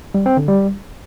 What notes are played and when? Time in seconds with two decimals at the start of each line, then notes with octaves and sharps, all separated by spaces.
0.15 G3
0.26 C4
0.37 D3
0.48 G3